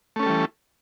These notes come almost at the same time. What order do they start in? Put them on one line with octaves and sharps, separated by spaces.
A3 C#4 A4 G3 E3